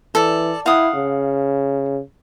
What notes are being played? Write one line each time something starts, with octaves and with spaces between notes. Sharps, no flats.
E3 A4 D5
E4 F5 F#5 D#6
C#3